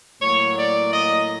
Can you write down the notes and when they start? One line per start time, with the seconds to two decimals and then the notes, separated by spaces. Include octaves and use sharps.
0.21 A2 F#3 A#3 C#5
0.57 D5
0.92 D#5